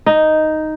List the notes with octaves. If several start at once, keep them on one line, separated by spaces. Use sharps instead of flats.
D#4